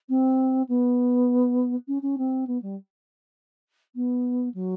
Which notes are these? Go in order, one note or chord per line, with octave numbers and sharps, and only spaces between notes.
C4
B3
C#4
C#4
C4
B3
G3
B3
F#3